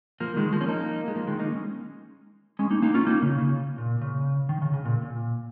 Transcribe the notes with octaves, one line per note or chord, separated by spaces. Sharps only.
F3 A#3
D#3 G#3
F3 A#3
C#4
A#3 D#4
G#3
F3 A#3
D#3 G#3
A#3 D#4
G#3 C#4
G#3 C#4
A#3 D#4
A#3 D#4
C#4 F4
A#3 D#4
C#3
C#3
A#2
C#3
D#3
C#3
C#3
A#2
A#2